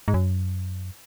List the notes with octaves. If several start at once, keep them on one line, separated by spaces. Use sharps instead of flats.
G#2
F#2